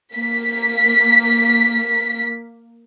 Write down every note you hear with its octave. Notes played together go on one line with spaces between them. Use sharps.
A#3 B6